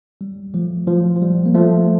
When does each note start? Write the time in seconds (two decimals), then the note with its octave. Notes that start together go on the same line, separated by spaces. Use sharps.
0.21 G3
0.54 F3 A3
0.88 F3
1.16 F3
1.22 G3
1.46 A#3
1.54 F3 A3